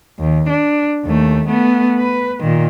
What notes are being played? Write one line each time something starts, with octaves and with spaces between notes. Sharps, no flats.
D#2
D4
D#2 A3
A3 B3
B4
A#2 D#3